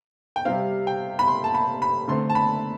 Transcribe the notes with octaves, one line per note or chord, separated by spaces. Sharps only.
G5
C3 G3 C4 F5
G5
B5
C6
A5
B5
B5
D3 A3 C4 C6
A5
B5